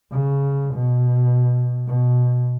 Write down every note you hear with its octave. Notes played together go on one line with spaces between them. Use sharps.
C#3
B2
B2